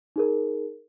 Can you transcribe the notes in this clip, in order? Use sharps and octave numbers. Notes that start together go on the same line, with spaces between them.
D#4 G#4 A#4